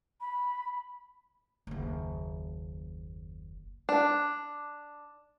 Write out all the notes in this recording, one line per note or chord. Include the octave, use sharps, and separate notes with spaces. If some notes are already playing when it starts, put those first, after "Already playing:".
B5
F#1 D#2
D4